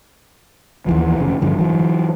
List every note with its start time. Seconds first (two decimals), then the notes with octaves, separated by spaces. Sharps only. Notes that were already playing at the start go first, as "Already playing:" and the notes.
0.86 D#2 E3 F3
1.18 F1 C#3
1.42 G2 D3 F3
1.58 E3 F#3